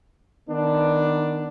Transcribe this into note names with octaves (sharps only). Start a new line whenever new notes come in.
D#3 B3 D4